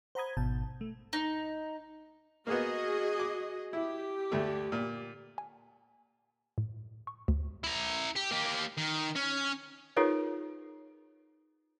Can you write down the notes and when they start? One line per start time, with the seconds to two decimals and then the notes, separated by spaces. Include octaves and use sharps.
0.15 C5 F#5 A#5 B5 D#6 G#6
0.37 G#1 B2 A5 G6
0.81 A3
1.13 D#4
2.47 A#3 B3 F#4 G#4 D#5
3.19 D6
3.73 E4 G4
4.32 D2 A3
4.72 A#2
5.38 G#5
6.58 A2
7.07 C#6
7.28 D2
7.64 E4 A#5
8.16 G4
8.31 A#3 G4
8.78 D#3
9.16 C#4
9.97 D#4 F4 G#4 A#4 B4 C#5